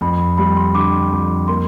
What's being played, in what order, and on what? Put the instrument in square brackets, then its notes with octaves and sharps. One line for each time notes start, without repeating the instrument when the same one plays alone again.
[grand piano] F2 [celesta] B5
[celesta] B5
[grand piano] G3 [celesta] B5
[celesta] C6
[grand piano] D3 [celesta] D6
[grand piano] F2
[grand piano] A#3 [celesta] C6